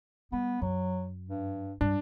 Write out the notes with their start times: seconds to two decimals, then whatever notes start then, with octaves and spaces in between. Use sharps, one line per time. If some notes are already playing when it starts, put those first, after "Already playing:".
0.32 G3 B3
0.62 F#2 F#3
1.28 G2
1.81 G2 D4